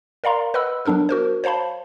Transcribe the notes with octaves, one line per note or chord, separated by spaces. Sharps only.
A#4 D5 F5 A#5 C6
B4 D#5 F#5 B5 E6
F#3 B3 D4 A4 A#4
F#4 A#4 C5
C5 C#5 F5 A5 B5